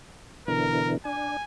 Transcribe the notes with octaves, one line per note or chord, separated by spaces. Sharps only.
B2 D3 E3 A#4
D4 G#5